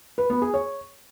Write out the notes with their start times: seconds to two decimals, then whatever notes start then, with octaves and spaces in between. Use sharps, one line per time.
0.18 B4
0.30 B3
0.42 G#4
0.54 C#5